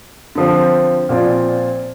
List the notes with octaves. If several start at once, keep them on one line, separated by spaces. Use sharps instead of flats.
D3 F3 C4
A#2 F3 C4 F4 D5